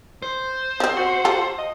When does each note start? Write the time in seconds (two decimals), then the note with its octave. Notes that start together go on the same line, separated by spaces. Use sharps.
0.22 C5
0.80 F3 C4
0.97 F#4
1.25 F4 G4 A4
1.58 D#5